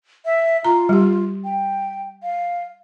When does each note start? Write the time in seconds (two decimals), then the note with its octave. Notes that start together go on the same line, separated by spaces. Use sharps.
0.25 E5
0.65 F4 A#5
0.89 G3 G4
1.44 G5
2.23 F5